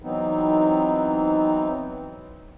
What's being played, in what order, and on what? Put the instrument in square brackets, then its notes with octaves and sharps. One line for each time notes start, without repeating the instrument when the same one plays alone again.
[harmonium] E3 F#3 B3 C4 D#4